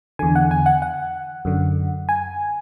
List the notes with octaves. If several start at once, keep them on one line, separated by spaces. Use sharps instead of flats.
E2 D3 G#5
F#5
G#5
F#5
F#5
F#2 D3
G#5